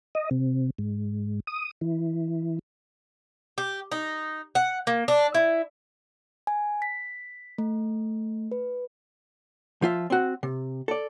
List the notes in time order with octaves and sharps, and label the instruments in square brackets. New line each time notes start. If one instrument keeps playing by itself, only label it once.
[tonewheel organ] D#5
C3
G#2
D#6
E3
[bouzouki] G4
D#4
F#5
A#3
D4
E4
[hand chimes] G#5
B6
A3
B4
[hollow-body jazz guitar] F3 F4 E5
C4 F#4
C3
A4 D5